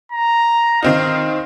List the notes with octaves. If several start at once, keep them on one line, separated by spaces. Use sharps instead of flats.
A#5
D#3 C4 D#4 F5